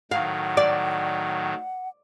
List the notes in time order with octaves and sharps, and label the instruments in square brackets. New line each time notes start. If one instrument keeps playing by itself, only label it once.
[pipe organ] A2 D#3 F#3 [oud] F5 [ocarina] F#5
[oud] D5